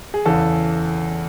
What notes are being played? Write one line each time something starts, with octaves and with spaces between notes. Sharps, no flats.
G#4
E2 C#3 E3 A4